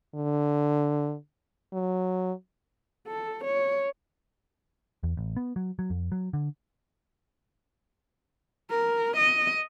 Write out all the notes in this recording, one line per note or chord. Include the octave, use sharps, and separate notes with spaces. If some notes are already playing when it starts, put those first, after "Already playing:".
D3
F#3
A4
C#5
E2
A1
B3
F#3
F#3
F2
F#3
D3
A#4
D#5